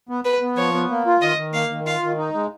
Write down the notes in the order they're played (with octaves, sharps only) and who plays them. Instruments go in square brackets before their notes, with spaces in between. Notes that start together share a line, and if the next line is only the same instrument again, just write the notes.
[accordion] B3
[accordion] B3 [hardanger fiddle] B4
[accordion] B3
[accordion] F3 [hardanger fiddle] C#5
[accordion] B3
A#3
F4
[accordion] D#3 [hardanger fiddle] D#5
[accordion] D#3
[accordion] A#3 [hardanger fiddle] F5
[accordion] D#3
[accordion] F4 [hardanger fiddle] F5
[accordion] D#3
D#4
G#3